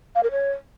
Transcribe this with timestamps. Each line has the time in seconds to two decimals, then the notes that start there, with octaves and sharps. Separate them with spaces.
0.15 F5
0.23 A#4
0.31 C#5